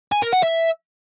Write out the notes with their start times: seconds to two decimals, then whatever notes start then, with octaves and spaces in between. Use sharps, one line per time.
0.12 G#5
0.22 A#4
0.32 F#5
0.43 E5